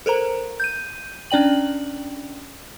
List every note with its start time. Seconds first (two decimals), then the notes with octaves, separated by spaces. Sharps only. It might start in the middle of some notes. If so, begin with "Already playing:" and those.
0.06 A4 A#4 C5 A#5
0.60 G6 D#7
1.31 C#4 D4 D5 G5 F#7